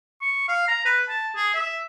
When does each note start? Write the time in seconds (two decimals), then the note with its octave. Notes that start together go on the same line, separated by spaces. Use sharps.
0.21 C#6
0.48 F5
0.68 A#5
0.85 B4
1.09 A5
1.36 G#4
1.54 E5